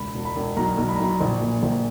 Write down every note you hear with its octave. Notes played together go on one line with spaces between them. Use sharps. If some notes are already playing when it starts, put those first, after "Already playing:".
Already playing: E1 C#2 B5
E1
B5
E1
B1 A#5
B1
B5
A#5
B1 B5
A#1
A#2
A#1